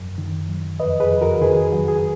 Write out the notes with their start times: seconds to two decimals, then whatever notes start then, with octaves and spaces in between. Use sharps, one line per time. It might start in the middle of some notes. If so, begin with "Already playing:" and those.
Already playing: F#2
0.18 D#3
0.49 F#3
0.80 F2 B4 D#5
1.00 G#4 B4
1.11 F2
1.21 F#4 A#4
1.41 D#3 G#4 B4
1.57 G#4
1.72 F#3 F#4
1.88 G#4